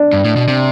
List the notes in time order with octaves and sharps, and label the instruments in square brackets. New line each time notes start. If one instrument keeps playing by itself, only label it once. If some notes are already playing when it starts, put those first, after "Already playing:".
Already playing: [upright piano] D4
[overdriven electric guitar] G2
A2
B2
C3